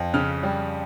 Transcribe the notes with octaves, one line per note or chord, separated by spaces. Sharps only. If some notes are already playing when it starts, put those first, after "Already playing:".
Already playing: F2
C#3 F6
G3